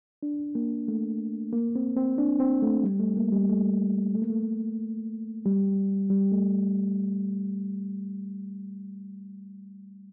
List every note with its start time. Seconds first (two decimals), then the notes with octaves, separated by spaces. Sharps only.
0.23 D4
0.55 A#3
0.88 A3
1.53 A#3
1.75 C4
1.96 C4
2.18 D4
2.40 C4
2.62 A3
2.84 G3
3.00 A3
3.17 A#3
3.32 G3
3.50 A3
4.15 A3
4.22 A#3
4.30 A3
5.46 G3
6.10 G3
6.32 A3